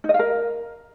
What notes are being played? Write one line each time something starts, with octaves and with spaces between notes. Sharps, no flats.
D#4
D#5
F5
A#4